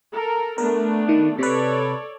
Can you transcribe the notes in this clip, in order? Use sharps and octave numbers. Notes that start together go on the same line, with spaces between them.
A4 A#4
A3 B3 D4 A#4
D#3
C3 A4 B4 C#5 D5